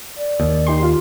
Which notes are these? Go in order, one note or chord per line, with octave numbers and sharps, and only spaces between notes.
D5
D#2
D#4 G4 C6
F4